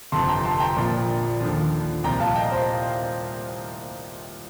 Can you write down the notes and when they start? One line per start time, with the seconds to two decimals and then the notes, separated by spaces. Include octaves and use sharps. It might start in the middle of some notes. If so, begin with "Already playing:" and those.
0.12 G1 F2 C3 F3 A5 C6
0.29 G5 A#5
0.45 A5 C6
0.60 G5 A#5
0.76 A#1 A#2 F3
1.41 D#2 D3 F3
2.04 C2 A#2 F3 G5 A#5
2.20 F5 A5
2.36 D#5 G5
2.52 C5 D#5